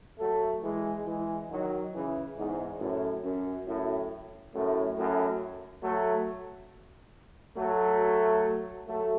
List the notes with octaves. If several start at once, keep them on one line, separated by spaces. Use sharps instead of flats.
F#3 A3
E3 G#3
E3 G#3
D#3 F#3
C#3 E3
E2 G#2
F#2 A2
F#2
F#2 A2
F#2 A2
F#2 A2
F#3 A3
F#3 A3
F#3 A3